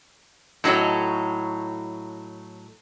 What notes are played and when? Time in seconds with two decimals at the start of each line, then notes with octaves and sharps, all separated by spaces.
0.64 A2 F#3 D#4 A4 C#5